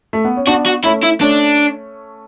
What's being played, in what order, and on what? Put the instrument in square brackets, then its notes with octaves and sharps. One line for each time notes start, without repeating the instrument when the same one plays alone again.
[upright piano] A3
B3
C#4
[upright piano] B3 D4 [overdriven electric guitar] F#4
[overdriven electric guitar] F#4
[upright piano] A3 C#4 [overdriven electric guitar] E4
[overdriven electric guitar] E4
[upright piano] A3 C#4 [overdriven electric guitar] D4